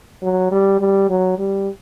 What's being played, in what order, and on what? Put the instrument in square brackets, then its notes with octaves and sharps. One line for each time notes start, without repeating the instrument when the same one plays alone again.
[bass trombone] F#3
G3
G3
F#3
G3